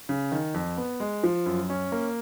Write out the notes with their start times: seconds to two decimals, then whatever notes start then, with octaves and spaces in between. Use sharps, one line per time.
0.09 C#3
0.32 D#3
0.54 F2
0.77 B3
1.00 G#3
1.23 F3
1.46 F#2
1.70 C#4
1.92 A#3